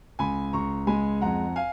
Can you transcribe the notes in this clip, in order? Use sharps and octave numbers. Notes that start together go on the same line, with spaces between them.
C#2 G#5 B5
C#2 A#5 C#6
G#3 G#5 B5
F2 F#5 A#5
F5 G#5